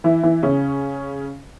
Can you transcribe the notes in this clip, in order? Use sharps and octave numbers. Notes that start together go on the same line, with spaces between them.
E3 E4
E3 E4
C#3 C#4